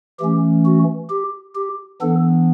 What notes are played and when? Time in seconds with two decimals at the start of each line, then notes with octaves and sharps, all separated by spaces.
0.20 E3 A3 C#4 G4
0.65 F#4
1.10 G4
1.55 G4
2.01 E3 B3 D4 A4